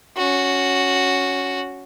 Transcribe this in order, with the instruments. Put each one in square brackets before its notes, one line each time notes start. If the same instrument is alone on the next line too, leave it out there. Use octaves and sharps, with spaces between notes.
[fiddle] C#4 F#4